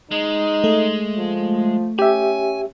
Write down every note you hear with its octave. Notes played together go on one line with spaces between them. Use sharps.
G#3 D#4
A3
F3
C#4 G4 E5 G#5